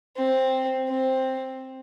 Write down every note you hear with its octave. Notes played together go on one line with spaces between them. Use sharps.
C4
C4